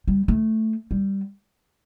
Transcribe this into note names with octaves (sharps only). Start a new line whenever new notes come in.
G3
A3
G3